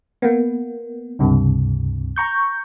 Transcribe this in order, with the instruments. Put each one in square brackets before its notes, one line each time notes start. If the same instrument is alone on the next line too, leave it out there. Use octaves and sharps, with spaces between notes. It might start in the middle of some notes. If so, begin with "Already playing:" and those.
[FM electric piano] A#3 B3
C#2 G2 C3
A#5 C#6 G6